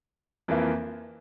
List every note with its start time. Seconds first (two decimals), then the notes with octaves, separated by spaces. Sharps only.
0.48 F2 E3 A#3 E4